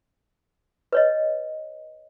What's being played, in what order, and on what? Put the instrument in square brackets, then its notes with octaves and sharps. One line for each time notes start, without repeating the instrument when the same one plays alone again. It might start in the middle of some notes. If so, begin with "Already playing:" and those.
[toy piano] B4 C#5 D#5